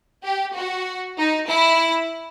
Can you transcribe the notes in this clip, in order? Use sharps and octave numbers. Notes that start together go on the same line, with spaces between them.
G4
F#4
D#4
E4